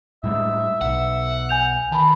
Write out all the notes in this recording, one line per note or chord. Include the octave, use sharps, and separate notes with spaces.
A2 G3 G#3 E5
B1 F#5
G#5 G6 F7
D#3 B4 A5 B5